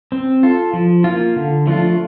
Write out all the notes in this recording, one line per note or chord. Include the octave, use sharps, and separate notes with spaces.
C4
F4 A4
F3
A#3 F4
D3
F3 A3 D4 F4